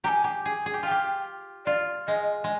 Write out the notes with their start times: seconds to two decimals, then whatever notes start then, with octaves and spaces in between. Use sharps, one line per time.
0.04 G4 A#5
0.09 G#5
0.24 G4
0.46 G#4
0.66 G#4
0.74 G4
0.83 F4 G5
0.91 G4
1.66 F4 D5
2.07 G#3 D#5
2.44 G#3